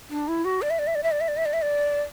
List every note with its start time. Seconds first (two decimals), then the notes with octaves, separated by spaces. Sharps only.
0.10 D4
0.28 E4
0.45 F#4
0.62 D5
0.70 E5
0.79 D5
0.87 E5
0.95 D5
1.03 E5
1.11 D5
1.21 E5
1.28 D5
1.37 E5
1.45 D5
1.53 E5
1.62 D5